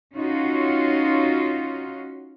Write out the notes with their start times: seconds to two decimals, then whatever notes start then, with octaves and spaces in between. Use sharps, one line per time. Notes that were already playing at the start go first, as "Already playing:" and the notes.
0.15 C#4 D#4 F4 F#4